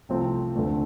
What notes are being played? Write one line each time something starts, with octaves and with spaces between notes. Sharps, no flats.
C2 C3 F3 A3 C4
D2 D3 A3